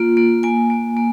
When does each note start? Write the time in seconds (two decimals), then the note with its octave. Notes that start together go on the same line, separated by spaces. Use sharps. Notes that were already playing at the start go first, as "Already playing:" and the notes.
Already playing: A#3 F4
0.17 A#3
0.43 A#3 G#5
0.70 A#3
0.97 A#3